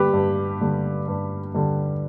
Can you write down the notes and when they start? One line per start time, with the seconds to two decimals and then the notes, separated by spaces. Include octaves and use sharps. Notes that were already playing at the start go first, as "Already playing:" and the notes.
Already playing: G2 D3 G3 G4 B4
0.13 G2
0.61 D3 G3
1.08 G2
1.55 D3 G3